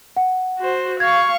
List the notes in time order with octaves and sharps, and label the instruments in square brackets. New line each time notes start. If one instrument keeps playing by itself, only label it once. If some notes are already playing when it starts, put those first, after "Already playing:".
[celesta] F#5
[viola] F#4 C5
[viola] F5 C#6 [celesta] G#6